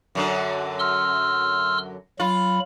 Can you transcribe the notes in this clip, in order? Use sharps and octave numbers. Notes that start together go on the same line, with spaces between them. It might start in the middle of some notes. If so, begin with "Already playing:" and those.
F#2 D3 F#3
C6 E6 F6
F#3 F4 B5